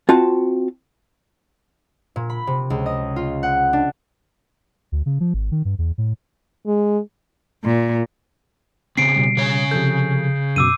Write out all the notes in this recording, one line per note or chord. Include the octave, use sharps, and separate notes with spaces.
C4 F4 F#4 A5
A#2
B5
C3
C#2
D#5
F4
F#5
D4
D2
C#3
F3
G#1
D#3
G2
E2
A2
G#3
A#2
C#3 C4 C7 D7
B2 G3
C#3 C#5
C3 F3 A4 G6
F#2 B2 D6 E6 D#7